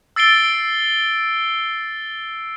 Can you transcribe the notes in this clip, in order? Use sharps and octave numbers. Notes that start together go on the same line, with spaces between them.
E6 A6 C7 D7 G7